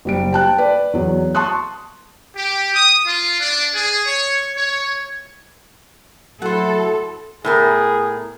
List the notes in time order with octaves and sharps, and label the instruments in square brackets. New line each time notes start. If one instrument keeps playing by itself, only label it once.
[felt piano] F#1 G3 D7
G5 A5 F#6
B4 D5
E2 F#3
A5 C6 C#6 D#6 F#6
[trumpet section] G4
D#6
F4
D4
G#4
C#5
C#5
[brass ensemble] F#3 A3 E4 [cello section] A4 [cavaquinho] C5 F#5
[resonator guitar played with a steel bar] A2 B3 A#4 [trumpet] G#4